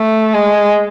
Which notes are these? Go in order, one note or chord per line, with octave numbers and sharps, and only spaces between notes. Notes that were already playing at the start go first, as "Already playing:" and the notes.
Already playing: A3
G#3